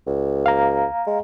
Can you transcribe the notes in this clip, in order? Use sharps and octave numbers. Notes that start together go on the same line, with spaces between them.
C#2
F5 A#5
G#3